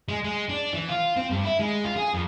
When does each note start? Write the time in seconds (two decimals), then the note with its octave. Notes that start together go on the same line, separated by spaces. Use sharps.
0.08 G#3
0.24 G#3
0.49 D4
0.73 E3
0.88 F4
1.16 C4
1.31 G2
1.44 E4
1.59 G#3
1.84 F4
1.96 G#4
2.14 F2